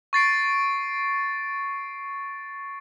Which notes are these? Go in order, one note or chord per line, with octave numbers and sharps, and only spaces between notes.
C#6 A6 C7 D7